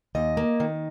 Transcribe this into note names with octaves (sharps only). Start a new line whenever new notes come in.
D#2 D#5
A#3
D#3